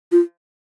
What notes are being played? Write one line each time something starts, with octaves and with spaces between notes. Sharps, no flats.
F4